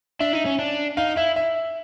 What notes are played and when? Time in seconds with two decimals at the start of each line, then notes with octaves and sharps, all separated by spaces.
0.20 D4 E5
0.33 D#4
0.46 C#4
0.59 D4
0.97 D#4 F5
1.17 E4 E5
1.36 E5